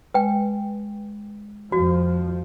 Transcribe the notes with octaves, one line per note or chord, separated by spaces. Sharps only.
G#3 B4 G5
F2 F3 F#4